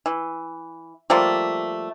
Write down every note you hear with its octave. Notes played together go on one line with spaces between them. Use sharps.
E3
F3 G3 A3 A#3